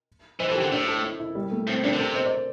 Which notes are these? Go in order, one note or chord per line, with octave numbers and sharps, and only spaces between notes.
E3 C5
E3 A4
G4
D3
A2 D4
A4
E4
E4
G3
A3
A2 C4
G2 D4
D3
C3 A4
C5
D5